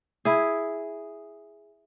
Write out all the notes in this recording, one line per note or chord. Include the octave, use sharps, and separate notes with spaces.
E4 G#4